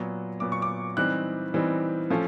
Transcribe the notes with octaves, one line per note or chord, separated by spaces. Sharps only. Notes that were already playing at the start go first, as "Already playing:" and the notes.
Already playing: A#2 F#3 B3
A#2 F#3 B3 D6
C#6
D6
E3 G3 C4 D#4 F#6
E3 G3 C4 D#4
F3 A3 C#4